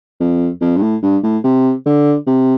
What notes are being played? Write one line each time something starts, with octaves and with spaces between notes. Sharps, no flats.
F2
F2
G2
A2
G2
A2
C3
D3
C3